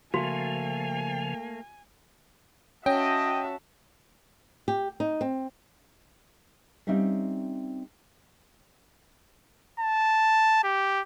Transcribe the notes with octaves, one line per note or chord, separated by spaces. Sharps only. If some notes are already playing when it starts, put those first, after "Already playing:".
C#3 F3 A3 A#3 F#4 G#5
C#4 F#4 D#5 E5 G5 A5
G4
D#4
C4
G3 C4 C#4 D#4 E5 F5
A5
G4